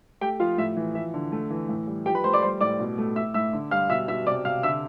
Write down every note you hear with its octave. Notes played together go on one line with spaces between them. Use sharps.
A3 G4 G5
F3 F4 F5
A2 E5
E3
F3 E5
D3
A3
E3
A2
G3
F3 G4 G5
B4 B5
A3 C5 C6
D5 D6
G3 C5 C6
A2 D5 D6
B2
A3
A2 E5 E6
A2 E5 E6
D3
G3 F5 F6
B2 E5 E6
B2 E5 E6
C3 D5 D6
C3 F5 F6
D3 E5 E6